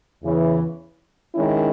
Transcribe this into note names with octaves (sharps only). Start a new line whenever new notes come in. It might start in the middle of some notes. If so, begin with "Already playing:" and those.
E2 C#3 E3
D#3 G#3 C#4 E4